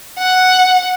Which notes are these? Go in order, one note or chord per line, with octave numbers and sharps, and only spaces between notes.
F#5